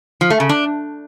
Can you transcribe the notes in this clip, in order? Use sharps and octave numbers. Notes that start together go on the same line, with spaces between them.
F3
A3
C#3
D4